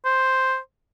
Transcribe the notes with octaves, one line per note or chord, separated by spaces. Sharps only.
C5